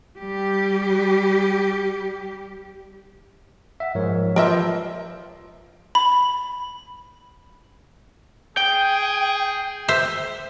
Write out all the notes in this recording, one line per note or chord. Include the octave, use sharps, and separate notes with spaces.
G3 G4
E5 F#5
G#2 F3 A#4 C#5
F3 A#4 B4 D#5 E5 C6
B5
G#4 G5
C5 E5